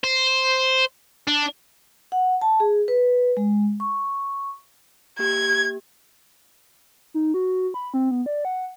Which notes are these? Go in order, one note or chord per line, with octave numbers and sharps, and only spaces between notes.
C5
D4
F#5
A5
G#4
B4
G#3
C#6
A#3 G4 G#6
D#4
F#4
B5
C4
B3
D5
F#5